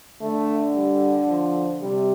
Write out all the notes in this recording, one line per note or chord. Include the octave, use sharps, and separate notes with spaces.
D3 A3
G3
F3
C3 G3